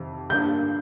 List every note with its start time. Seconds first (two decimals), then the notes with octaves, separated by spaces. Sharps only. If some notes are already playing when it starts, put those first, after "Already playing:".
Already playing: F2 C3 D#3
0.30 G2 D3 F3 A#3 D4 G6